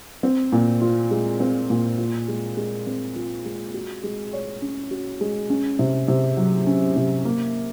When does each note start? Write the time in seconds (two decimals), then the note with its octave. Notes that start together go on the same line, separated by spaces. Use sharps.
0.23 C4
0.52 A#2
0.82 F4
1.11 G#3
1.40 C4
1.70 A#2
1.98 F4
2.28 G#3
2.57 G#3
2.87 C4
3.16 F4
3.45 G#3
3.74 F#4
4.03 G#3
4.33 C#5
4.62 C#4
4.91 F#4
5.21 G#3
5.50 C#4
5.79 C3
6.08 C3
6.37 F#3
6.67 C#4
6.96 C3
7.25 A#3